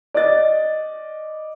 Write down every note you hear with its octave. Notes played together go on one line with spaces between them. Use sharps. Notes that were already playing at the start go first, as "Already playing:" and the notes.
D5 D#5 A6